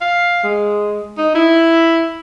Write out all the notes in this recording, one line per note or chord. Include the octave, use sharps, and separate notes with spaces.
F5
G#3
D#4
E4